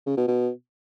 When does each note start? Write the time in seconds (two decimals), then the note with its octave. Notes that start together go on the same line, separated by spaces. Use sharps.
0.07 C#3
0.17 B2
0.28 B2